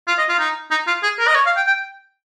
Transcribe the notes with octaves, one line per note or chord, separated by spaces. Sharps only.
F4
D#5
F4
D#4
D#4
F4
G#4
A#4
D#5
C#5
F5
G5
G5